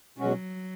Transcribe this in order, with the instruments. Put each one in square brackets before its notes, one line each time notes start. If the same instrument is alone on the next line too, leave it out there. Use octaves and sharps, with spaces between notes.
[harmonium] B2 G#3 C#4 F#4 [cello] F#3